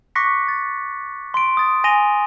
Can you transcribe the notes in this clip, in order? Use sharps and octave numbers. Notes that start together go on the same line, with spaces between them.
C#6 D6 F#6 A#6 B6 C#7
A6
C6 D7
D#6 A6
G#5 A#6 D#7 F7 G7